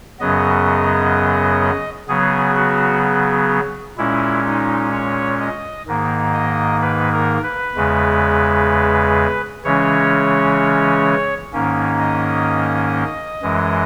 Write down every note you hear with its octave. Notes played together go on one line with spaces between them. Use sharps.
F#2 C#3 F#3 B3 D#5
C#3 F#3 B3 G#4
F#4
A#2 G#3 C#4 E4
D#4
C#5
D#5
G#2 D#3 A#3
D#5
B4
A#4
B4
E2 C#3 G#3
C#3 E3 G#3 C#4 C#5
G#2 D#3 A#3 C#4
D#5
F#2 E3 G#3